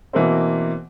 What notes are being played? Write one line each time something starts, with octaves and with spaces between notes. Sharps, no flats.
B2 E3 A#3 C4